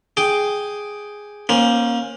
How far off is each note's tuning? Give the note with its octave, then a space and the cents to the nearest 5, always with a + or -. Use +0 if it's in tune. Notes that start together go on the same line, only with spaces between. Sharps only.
G#4 +0 G5 +0 D6 +0
A#3 +20 C#4 -15 C5 +5